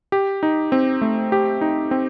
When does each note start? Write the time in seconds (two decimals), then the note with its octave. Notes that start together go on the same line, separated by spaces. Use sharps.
0.12 G4
0.43 D#4
0.72 C4
1.02 A3
1.32 G4
1.61 D#4
1.91 C4